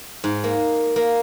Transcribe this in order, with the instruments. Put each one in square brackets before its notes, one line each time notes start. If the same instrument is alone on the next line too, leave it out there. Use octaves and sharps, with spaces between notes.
[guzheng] G#2
A#3
A#3